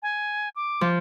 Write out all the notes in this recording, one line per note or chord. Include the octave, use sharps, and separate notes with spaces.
G#5
D6
F3